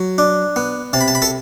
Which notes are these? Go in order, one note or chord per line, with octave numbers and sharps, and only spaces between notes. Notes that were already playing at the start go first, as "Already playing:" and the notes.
Already playing: F#3
D4
B3
C3 A5
B5
A5
B5
A4 A5